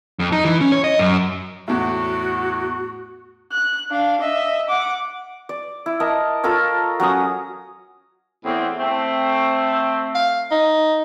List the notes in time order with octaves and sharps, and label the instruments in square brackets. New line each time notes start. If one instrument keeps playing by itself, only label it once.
[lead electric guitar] F2
D#4
E3
C#4
C#5
D#5
F#2
[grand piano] E2 A2 [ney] F#4
[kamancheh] F#6
D4 F5
D#5 E5
F#5 D6
[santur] D5
E4
A#4 D#5 A5
F4 A4 A#4 C#5
F#3 C#4 A#5 D#6
[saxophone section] E2 A2 C4
A3 C4
[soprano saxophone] F5
D#4